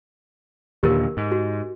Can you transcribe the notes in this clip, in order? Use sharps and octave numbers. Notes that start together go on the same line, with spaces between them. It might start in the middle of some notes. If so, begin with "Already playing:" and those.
D#2 A#2 D3 G4 A#4
G#2
F#4